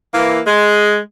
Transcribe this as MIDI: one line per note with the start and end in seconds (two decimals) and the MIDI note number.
0.14 0.41 52
0.14 0.41 58
0.47 0.98 56